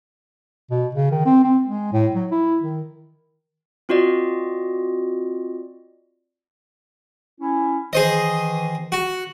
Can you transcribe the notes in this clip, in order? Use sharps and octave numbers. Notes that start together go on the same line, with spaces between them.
B2
C#3
D#3
C4
C4
G#3
A2
F#3
E4
D#3
C4 F4 F#4 D5 D#5
C#4 E4
D#3 E3 G#4 C5 D#5
F#4